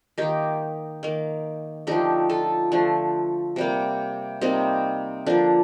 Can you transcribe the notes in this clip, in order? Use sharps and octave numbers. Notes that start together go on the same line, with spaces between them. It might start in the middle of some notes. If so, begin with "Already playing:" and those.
D#3 A#3 D#4 G4
D#3 A#3
D3 F3 A3 D#4 G4
F4 A4
D3 F3 A3
C3 G3 A#3
C3 G3 A#3 C4 D#4
D3 F3 A#3 D4